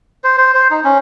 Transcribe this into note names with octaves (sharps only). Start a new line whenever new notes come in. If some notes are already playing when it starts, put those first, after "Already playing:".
C5
C5
C5
D#4
C#4